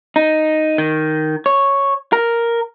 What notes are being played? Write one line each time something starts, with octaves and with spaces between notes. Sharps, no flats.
D#4
D#3
C#5
A#4